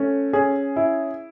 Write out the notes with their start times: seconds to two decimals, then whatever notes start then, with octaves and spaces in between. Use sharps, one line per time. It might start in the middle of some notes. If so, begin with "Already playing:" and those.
Already playing: A3 C#4
0.33 C#4 G#4
0.76 E4